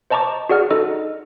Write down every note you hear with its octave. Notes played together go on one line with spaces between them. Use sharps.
C5 D#5 A5 A#5 C#6 D6
F#4 G#4 D5 F#5 F6
D#4 A4 D#5